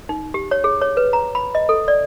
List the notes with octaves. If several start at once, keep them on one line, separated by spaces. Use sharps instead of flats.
D#4
G4
C#5
G#4
C#5
B4
A#5
B5
D#5
A4
D5